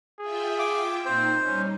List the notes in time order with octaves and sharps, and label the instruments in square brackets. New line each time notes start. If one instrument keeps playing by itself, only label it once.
[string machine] F4 E5 G5 [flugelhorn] G#4
[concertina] D6
[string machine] A#2 D#4 [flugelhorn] C4 [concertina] C5
[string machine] G3 D#4 [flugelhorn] C#4